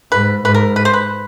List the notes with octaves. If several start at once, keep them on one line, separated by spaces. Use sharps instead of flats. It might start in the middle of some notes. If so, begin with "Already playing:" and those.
G#2 B4
G#2 B4
A#4
B4
C5
B4